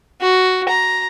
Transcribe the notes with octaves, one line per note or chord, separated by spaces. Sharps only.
F#4
A#5